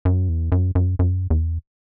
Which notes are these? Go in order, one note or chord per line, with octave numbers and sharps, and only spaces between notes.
F#2
E2
F#2
F#2
F#2
E2